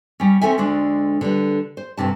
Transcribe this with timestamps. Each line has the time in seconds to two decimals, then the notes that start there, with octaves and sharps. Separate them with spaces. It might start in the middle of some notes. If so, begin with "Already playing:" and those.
0.20 G3 C#4
0.41 C4 C#4 D#4 A4 E5 G#5
0.58 D2 D3 G#3 D4
1.21 D3 G3 B4
1.77 C5
1.97 D2 G2 C3 A5